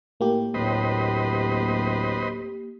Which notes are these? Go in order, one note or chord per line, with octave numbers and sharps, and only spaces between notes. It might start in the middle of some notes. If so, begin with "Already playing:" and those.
A2 A#3 G4
D1 A2 B4 C5 D#5